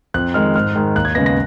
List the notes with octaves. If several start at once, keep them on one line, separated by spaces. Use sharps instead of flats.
F2 F#6
D#3 G#3 F6
G#2 F6
D#3 G#3
D#2 F#6
G#6
C#3 G#3 B3 A#6
A#6